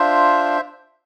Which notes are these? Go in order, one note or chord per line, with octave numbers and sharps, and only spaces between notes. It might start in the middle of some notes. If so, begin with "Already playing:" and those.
Already playing: D4 F4 C5 E5